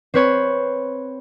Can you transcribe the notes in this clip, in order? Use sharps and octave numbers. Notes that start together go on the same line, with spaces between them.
C4 B4 C#5